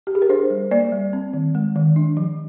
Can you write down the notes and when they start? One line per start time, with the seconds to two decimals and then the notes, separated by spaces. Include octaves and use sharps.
0.07 G4
0.15 G#4
0.22 A#4
0.29 D4 C5
0.50 G3
0.71 A#3 D5
0.92 G3
1.13 C4
1.33 D#3
1.55 G#3
1.76 D#3
1.96 D4
2.17 F3